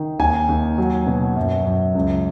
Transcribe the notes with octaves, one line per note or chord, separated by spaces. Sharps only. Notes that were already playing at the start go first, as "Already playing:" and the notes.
Already playing: D#3
D#2 G#5
D#2
F#3
B2
F#2
F#2
C#2